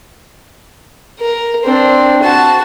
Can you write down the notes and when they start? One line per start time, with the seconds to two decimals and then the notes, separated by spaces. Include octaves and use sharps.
1.20 A#4
1.64 C4 D4
2.23 F#4 A5